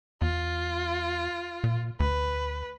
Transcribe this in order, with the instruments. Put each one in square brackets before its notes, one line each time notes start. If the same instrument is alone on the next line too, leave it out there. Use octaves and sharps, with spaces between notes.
[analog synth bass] E2 [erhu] F4
[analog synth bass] A#2
[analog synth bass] D2 [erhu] B4